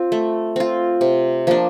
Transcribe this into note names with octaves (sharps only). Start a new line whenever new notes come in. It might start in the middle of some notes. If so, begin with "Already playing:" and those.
Already playing: C4 F4
A3
C4 F4
C3
F3 A#3 D4